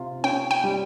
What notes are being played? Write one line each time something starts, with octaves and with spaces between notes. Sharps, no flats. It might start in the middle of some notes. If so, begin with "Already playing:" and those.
Already playing: C3 F4
C#4 G5
G5
G3